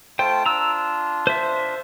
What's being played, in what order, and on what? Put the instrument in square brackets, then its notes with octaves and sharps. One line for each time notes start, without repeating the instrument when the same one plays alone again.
[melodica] A3 F4 A5 [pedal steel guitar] C5 G5
[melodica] D4 F4 [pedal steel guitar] A#5 E6
[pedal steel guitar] C5 E5